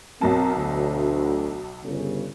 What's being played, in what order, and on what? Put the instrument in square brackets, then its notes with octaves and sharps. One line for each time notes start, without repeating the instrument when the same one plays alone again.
[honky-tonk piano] B1 F#3 A5 [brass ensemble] C4 A#4
[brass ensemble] D2
G1 C#3